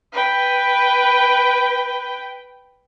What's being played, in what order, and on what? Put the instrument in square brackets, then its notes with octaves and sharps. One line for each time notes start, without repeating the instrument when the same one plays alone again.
[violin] B4 G5